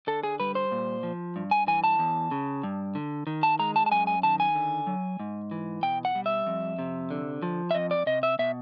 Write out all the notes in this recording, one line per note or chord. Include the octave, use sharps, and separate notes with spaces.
D3 A4
G#4
G3 B4
C5
A#2
F3
G2
G#5
E3 G#5
A5
E2
C#3
G2
D3
D#3
A5
G#3 A#5
A5
A5
F#2 G#5
G#5
D#3 A5
G#5
D3
F#3
G#2
E3
B2 G5
F#5
G3
E5
F2
C3
D3
F3
E5
F2 D#5
D5
C3 D#5
E5
B2 E5